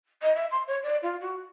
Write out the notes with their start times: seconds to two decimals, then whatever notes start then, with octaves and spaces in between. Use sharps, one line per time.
0.22 D#5
0.34 E5
0.51 C6
0.67 C#5
0.83 D5
1.02 F4
1.20 F#4